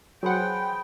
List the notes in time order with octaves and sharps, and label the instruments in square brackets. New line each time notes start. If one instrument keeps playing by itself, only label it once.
[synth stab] F#3 F#5 [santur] G#4 B4 C5 [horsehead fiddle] G5